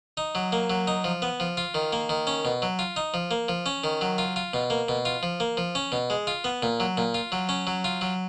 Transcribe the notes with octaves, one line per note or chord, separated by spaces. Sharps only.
D#4
F#3
A#3
F#3
D#4
F3
B3
F3
F4
D#3
A#3
D#3
C#4
B2
F#3
F4
D#4
F3
A#3
F3
C#4
D#3
F#3
F4
F4
B2
A#3
B2
F4
F3
A#3
F3
C#4
B2
G#3
F4
B3
A#2
F#3
A#2
F4
F#3
C#4
F#3
F4
F#3